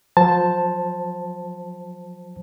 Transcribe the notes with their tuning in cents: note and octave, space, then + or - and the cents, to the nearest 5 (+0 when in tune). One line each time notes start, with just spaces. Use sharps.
F3 +40 C5 +0 A5 +0